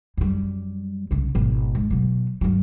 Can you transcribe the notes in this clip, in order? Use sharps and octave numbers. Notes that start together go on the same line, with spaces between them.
F#2 G3
C2 C#3
G#1 B2
G#2
B2 F#3
G2 F#3